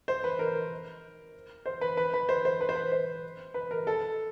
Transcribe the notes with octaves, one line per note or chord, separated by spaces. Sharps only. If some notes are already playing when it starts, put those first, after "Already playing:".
C5
B4
A#4
C5
B4
B4
B4
C5
C5
B4
C5
B4
C5
B4
A#4
A4